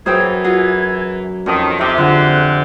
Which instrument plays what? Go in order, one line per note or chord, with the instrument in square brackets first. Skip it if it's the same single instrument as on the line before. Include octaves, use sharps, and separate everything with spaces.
[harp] F#2 [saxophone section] E3 [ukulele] G#4 C5 G5 [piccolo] G#6
[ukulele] F4 F#4 G#4
[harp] F2 D#6 [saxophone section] D#3 [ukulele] C#4 [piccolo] A5
[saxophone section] C3 [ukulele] D#4 G4 [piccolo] E5
[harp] D3 [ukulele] F4 G#4 [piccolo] F#6